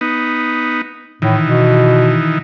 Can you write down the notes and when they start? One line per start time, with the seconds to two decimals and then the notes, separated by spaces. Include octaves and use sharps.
0.01 B3 D#4
1.22 A2 D#3 E3
1.43 B2